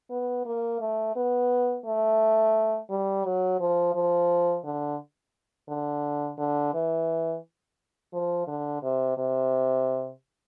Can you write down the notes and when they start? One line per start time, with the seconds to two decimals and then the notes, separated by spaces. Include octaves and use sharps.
0.11 B3
0.46 A#3
0.81 A3
1.16 B3
1.86 A3
2.90 G3
3.25 F#3
3.60 F3
3.95 F3
4.65 D3
5.69 D3
6.39 D3
6.74 E3
8.14 F3
8.48 D3
8.83 C3
9.18 C3